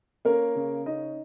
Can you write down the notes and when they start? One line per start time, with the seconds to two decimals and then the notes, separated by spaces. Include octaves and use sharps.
0.25 A#3 C#4 A#4
0.55 C#3
0.86 C#4 D#4 D#5